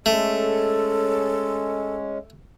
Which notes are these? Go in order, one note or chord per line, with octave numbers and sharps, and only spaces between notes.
G#3 A3 C#4 A4